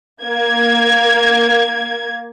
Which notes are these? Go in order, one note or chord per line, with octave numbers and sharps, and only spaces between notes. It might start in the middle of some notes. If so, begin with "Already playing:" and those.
A#3 G#6